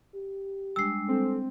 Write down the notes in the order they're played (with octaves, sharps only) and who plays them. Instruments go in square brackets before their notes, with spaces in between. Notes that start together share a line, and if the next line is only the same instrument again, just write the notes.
[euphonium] G4
[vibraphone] G3 G#3 D4 [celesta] E6 C7
[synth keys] C4 [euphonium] A4